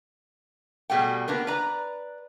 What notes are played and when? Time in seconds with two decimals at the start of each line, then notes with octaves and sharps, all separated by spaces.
0.90 B2 G3 A3 G#4 F#5 G5
1.28 A#3 B3 D4 A#4
1.47 B4 D5 A#5